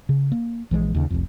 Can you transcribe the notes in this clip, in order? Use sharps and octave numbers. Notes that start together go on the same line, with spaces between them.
C#3
A#3
A#1 E3 G#3
D#2 C#3
F1 C2 F2